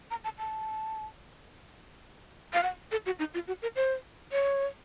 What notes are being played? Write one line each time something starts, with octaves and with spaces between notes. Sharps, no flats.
A#5
A5
A5
F5
F#5
A4
F#4
D#4
F4
F#4
A#4
C5
C#5